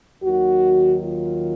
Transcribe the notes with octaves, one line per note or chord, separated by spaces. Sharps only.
D#2 D#3 F#3 F#4
F4